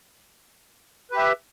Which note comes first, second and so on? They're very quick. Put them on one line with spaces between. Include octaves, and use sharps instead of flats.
B4 G4 E5